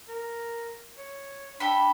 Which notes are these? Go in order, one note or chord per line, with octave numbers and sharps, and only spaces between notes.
A#4
C#5
D4 G4 A4 B5